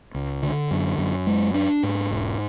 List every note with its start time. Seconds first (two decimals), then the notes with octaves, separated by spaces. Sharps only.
0.14 C#2
0.43 D3
0.71 F#2
0.98 F#2
1.27 G#3
1.54 D4
1.83 G#2
2.11 E1